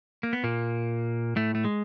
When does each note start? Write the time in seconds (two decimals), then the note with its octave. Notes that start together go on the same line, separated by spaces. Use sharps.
0.23 A#3
0.33 B3
0.44 A#2 A#3
1.36 A2 A3
1.55 A3
1.65 G#3